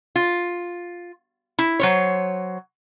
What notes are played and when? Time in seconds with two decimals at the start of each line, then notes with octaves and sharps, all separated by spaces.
0.16 F4
1.59 E4
1.80 F#3 C5 C#5